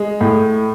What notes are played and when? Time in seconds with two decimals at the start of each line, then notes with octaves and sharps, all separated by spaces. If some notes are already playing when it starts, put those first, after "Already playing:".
Already playing: G#3
0.21 A2